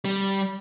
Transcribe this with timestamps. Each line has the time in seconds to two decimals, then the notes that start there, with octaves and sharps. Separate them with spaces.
0.05 G3